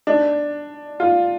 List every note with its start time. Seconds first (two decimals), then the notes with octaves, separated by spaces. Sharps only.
0.07 D4
1.00 F4